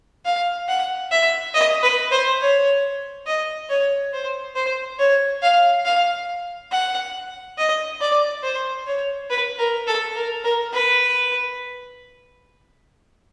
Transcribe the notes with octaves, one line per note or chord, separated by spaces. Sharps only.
F5
F#5
E5
D#5
B4
C5
C#5
D#5
C#5
C5
C5
C#5
F5
F5
F#5
D#5
D5
C5
C#5
B4
A#4
A4
A#4
A#4
B4